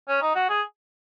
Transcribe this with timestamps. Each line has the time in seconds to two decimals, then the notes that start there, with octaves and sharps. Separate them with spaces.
0.09 C#4
0.22 D#4
0.35 F#4
0.49 G#4